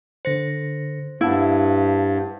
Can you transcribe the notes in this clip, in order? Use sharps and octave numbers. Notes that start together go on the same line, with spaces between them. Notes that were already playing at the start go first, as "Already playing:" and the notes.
D3 C5 A#6 C#7
G2 E4 F5 F#5 A5